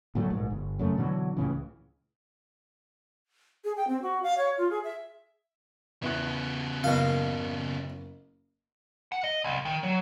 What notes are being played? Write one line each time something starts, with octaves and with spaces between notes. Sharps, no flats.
D2 A2 F#3 A3
A#1 G#2
G1
F#2 C#3 A3
B2 D3 E3 F#3
C#2 A2 C#3 E3
G#4
G5
C4
F#4
F5
C#5
F4
G#4
E5
E2 C#3 B3 E5 F#6
F#1 B2 A#3 F5
F#5
D#5
C2
D#3
F#3